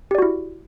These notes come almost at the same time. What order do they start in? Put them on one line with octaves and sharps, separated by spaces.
G4 D5 F#4 E4